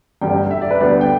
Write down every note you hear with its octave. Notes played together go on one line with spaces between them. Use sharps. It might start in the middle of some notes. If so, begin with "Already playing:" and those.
G1 G2 D3 G3 G5
E5
D5
B4
D2 D3 G3 B3 D5
G5